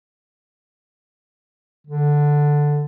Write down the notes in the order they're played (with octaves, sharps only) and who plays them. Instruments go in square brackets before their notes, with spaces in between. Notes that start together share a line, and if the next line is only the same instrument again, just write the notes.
[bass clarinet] D3